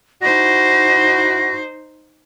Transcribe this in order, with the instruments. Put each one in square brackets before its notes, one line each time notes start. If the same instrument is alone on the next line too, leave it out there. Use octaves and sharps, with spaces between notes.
[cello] D#4 C5 [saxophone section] E4 F#4 [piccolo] A#6